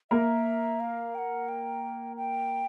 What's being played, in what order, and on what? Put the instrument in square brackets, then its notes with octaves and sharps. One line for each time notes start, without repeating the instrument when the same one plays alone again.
[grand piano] A#3 A#4 [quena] E5
[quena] F5
G5
F#5
G5
G5